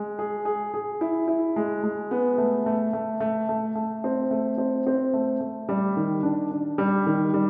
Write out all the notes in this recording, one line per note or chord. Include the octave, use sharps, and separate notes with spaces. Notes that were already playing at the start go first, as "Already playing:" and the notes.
Already playing: G#3
G#4
G#4
G#4
E4
E4
G#3
G#3
B3
A3
A3
A3
A3
A3
A3
C4
A3
C4
C4
A3
A3
G3
D#3
D4
D4
G3
D#3
G3